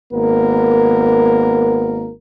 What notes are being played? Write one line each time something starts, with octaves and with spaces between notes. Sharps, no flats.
G#1 A#3 B3 A#4